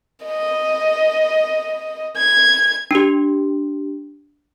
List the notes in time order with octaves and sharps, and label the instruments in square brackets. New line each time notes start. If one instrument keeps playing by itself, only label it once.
[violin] D#5
G#6
[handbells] D4 G4